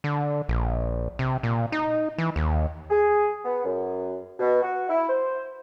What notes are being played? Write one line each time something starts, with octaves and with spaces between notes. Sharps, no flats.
D3
A#1
C3
A#2
D#4
E3
D#2
G#4
B3
F#2
B2
F#4
E4
C5